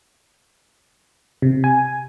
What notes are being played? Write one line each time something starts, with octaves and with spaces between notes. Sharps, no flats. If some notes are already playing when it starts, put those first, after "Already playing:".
C3
G#5